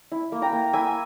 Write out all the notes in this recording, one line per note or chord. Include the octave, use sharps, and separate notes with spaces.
E4
A#3
G5 A#5
A#3
E4 E5 G#5